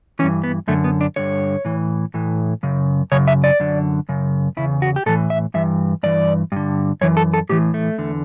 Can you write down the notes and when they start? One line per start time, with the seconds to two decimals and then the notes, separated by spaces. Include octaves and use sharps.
0.19 E3 C#4
0.23 G2
0.44 B3
0.68 F#2 D3 A3
0.84 B3
1.01 D4
1.16 G2 D3 C#5
1.65 A2 E3
2.14 A2 E3
2.63 F#2 C#3
3.12 F#2 C#3 C#5
3.28 E5
3.44 D5
3.60 F#2 D3
4.09 F#2 C#3
4.57 E2 C#3 E4
4.82 F#4
4.96 G4
5.06 A2 E3 A4
5.30 E5
5.54 G2 E3 E5
6.03 G2 E3 D5
6.52 G2 D3
7.01 F#2 E3 C#5
7.17 A4
7.34 A4
7.49 A2 E3 G4
7.74 A3
7.98 E2 D3